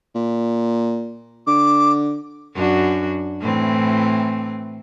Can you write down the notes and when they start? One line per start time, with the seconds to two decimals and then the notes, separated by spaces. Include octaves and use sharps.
0.15 A#2
1.47 D3 D6
2.54 F#2 D4 F#4
3.41 A2 E3 C4